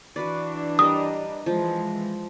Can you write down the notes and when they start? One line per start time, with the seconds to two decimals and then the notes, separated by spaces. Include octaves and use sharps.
0.16 E3 D4 F#4 B4 D5
0.79 G3 A#4 D#5 D#6
1.46 E3 F3 G#3